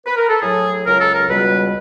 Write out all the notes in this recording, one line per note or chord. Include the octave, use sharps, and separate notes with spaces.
B4
A#4
A4
A2 F#3 G#4
C#2 C#3 F#3 A#4
A4
A#4
C#2 B2 G3 B4